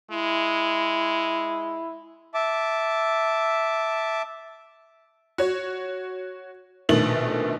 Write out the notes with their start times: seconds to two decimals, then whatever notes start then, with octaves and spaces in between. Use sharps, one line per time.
0.11 G#3 E4
2.34 E5 A5 D6
5.38 F#4 C#5
6.89 A#1 B2 D#3 A3 F#7